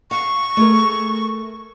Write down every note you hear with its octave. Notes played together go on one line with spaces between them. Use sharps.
F5 C#6
A3 G#4 A#4